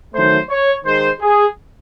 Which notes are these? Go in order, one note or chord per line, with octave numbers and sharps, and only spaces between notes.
D#3 F#3 A3 C5
C#5
D#3 G#3 C5
G#4